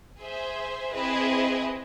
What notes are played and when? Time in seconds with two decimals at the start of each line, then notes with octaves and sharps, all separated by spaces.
0.19 G#4 C5 E5
0.93 C4 E4 G#4 B4 D#5